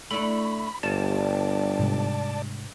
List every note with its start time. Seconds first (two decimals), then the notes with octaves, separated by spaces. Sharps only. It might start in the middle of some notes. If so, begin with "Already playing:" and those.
0.11 A3 D4 E4 B5
0.83 G1 G2 D5 A5
1.79 G#2 C3 G#3